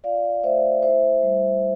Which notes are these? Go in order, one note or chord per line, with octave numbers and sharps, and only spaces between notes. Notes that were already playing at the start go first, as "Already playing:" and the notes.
F4 D5 F5
A3 C5 E5
E4 C5 E5
G3